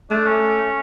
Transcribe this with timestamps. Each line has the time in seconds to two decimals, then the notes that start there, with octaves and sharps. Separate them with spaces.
0.11 A3 D4
0.26 C#4